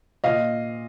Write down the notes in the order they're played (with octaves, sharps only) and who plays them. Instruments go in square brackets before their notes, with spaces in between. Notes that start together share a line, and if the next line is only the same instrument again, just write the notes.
[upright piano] A#2 D#5 F5